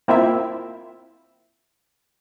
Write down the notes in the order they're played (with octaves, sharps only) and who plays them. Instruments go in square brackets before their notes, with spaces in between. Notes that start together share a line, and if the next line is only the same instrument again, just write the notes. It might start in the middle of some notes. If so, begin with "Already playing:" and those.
[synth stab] A#3 C4 E4 F4 E5